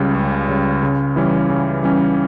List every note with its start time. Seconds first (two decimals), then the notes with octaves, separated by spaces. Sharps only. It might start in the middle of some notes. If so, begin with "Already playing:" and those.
Already playing: C#2 C#3 G3
0.15 C#2
0.49 C#3 G3
0.83 C#3
1.16 E3 G3 C#4
1.50 C#3
1.83 E3 G3 C#4